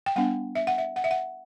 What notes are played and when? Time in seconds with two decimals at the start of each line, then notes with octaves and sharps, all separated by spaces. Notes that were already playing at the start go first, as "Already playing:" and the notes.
0.06 G5
0.16 G3 B3 D4 F#5
0.55 E5
0.67 F#5
0.78 E5
0.96 F#5
1.04 E5
1.11 F#5